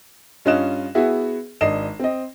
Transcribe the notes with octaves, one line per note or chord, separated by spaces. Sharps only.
G2 C#4 F4 D#5 F#6 E7
B3 E4 F#4 G#4 E5
G#1 D4 D#5 C7 E7
C4 D#5